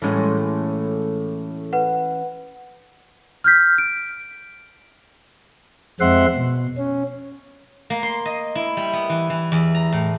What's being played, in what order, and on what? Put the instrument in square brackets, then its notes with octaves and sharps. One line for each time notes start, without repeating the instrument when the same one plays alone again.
[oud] A2 G#3 D#5 [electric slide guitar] E3 C#4
[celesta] B4 F#5
F6 G6 B6
D7
[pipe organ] F2 G#3 C4 E5 F#5 C6
B2
C#4
[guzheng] A#3
C6
D#5
E4
G3
B3
E3
E3
E2
A#5
A2